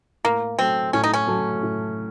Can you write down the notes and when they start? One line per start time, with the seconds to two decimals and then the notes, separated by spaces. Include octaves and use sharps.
0.24 A2 A#3
0.58 F#3 A3 C4
0.93 A2 C#4
1.04 D#4
1.13 C#4
1.27 F#3 A3
1.63 A2